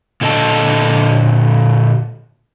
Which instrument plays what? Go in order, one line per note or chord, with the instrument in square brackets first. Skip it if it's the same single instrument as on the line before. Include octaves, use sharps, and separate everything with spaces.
[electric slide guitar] A#2 D3 A4 D#5 A5